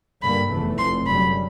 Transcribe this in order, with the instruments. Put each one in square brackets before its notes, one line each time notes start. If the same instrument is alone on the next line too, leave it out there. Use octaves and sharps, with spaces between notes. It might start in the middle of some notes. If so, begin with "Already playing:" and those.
[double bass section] G2 D3 G3 A#3 [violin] B5
[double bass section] F1 E2 C3 E3 A3
[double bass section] F1 F2 C3 [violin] C6
[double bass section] F#2 D3 G3 [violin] B5